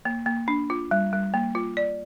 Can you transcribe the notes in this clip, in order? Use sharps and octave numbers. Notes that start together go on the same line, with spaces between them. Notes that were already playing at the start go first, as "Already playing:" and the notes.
A#3
A#3
D4
F4
G3
G3
A#3
F4
D5